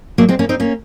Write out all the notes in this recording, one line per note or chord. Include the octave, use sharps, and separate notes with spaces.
F#3 A#3
G#3 C4
A#3 C#4
C4 D#4
A#3 C#4